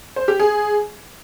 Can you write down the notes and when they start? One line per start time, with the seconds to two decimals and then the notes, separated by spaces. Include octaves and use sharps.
0.16 C5
0.28 G4
0.40 G#4